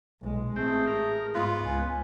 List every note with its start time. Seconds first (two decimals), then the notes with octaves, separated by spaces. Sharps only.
0.22 B1 A#2 G#3
0.56 A1 A3 C4 G#4
0.87 A#4
1.35 G#2 B3 F4
1.65 C#2 G#5